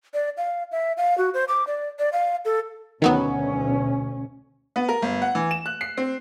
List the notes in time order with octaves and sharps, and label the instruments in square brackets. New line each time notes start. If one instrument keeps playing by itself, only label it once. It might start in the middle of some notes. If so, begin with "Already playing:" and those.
[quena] D5
F5
E5
F5
F#4
C5
D6
D5
D5
F5
A4
[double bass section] D2 B2 C#4 [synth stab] D#3 F#3 B3
[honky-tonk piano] B3
A#4
G1
F#5
E3
E7
F#6
C7
C4